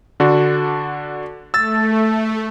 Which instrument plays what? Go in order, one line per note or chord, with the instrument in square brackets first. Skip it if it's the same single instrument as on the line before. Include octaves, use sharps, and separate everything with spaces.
[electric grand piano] D3 D4 F#4
[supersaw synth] A3 [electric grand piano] E6 A6